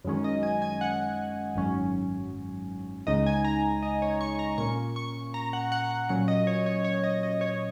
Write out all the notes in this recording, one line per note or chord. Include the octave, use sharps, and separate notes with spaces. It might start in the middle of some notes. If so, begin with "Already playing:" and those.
F#2 D#3 G#3 C#4
D#5
G#5
G#5
F#5
G#1 F#2 F#3 C#4
C#2 C#3 G#3 D#4 D#5
G#5
A#5
D#5
C#5
C#6
A#5
A#2 A#3 C#4 C#6
C#6
A#5
F#5
F#5
F#5
A#2 F#3 C#4 F#5
D#5
C#5
C#5
C#5
D#5
D#5
C#5